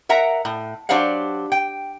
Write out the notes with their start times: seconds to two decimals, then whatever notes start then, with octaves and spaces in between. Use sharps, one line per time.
0.09 A#4 E5 F#5 A#5
0.45 A2
0.89 F#3 D4 G4 C5 F5 F#5
1.52 G5